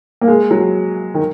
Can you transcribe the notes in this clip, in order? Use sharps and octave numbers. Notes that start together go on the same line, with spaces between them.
A#3
G#3
F#3
D#3